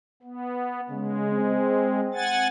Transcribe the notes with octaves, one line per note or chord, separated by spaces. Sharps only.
B3
C#3 G#3
C4
F#5 G#5 A6